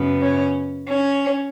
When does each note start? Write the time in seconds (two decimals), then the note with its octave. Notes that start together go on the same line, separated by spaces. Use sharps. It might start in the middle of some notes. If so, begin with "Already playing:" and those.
Already playing: F#2 C#3 B3
0.21 C#4
0.89 C#4